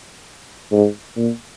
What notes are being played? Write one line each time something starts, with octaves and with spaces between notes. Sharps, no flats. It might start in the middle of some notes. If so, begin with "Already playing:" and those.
G#2
A#2